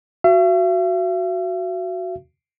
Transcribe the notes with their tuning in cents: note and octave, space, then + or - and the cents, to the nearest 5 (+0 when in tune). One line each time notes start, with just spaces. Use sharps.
F#4 +0 E5 +45